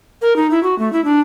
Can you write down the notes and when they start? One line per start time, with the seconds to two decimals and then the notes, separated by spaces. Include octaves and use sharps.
0.22 A#4
0.36 D#4
0.51 E4
0.63 F#4
0.79 A3
0.93 E4
1.05 D4